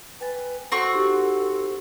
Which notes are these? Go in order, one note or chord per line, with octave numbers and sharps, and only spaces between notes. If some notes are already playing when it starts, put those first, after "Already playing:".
B4 G5 G#5 A6
C4 F#4 A4 C#6
D#4 G4 C6